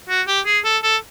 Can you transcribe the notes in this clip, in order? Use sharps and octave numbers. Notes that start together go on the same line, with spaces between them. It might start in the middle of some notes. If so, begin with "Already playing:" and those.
F#4
G4
G#4
A4
A4